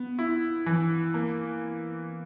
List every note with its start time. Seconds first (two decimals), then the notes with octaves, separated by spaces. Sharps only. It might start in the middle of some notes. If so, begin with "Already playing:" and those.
Already playing: B3
0.19 E4
0.66 E3
1.14 A#3